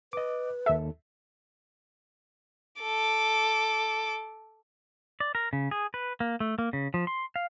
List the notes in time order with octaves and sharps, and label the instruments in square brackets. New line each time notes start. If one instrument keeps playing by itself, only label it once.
[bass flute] B4 [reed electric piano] D#5 D6
[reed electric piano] D#2 A4 [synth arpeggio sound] E5
[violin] A4 D6
[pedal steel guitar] D5
A#4
C#3
G#4
B4
A#3
A3
A#3
C#3
F3
C6
F5